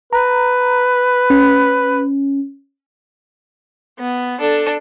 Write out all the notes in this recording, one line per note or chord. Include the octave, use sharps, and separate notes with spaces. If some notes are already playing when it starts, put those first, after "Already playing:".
B4 A#5
C#4
B3
D4 A4